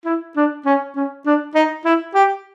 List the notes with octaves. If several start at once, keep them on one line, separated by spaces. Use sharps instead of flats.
E4
D4
C#4
C#4
D4
D#4
E4
G4